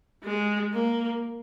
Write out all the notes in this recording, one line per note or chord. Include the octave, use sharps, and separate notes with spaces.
G#3
A#3